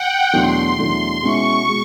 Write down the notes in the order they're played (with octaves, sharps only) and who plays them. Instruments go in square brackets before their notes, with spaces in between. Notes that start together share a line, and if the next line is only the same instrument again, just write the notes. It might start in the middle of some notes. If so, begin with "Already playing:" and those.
Already playing: [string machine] F#5 G5
[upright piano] E2 B2 F#3 A3 D4 [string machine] C6
[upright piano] E2 B2 F#3 A3 D4 [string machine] C6
[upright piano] B2 G#3 C#4 E4 [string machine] C#6
[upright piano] B2 G#3